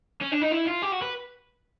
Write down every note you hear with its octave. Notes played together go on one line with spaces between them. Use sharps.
C#4
D4
D#4
E4
F4
G4
F#4
B4